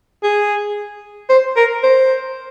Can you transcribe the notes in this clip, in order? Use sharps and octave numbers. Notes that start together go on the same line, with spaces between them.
G#4
C5
A#4
C5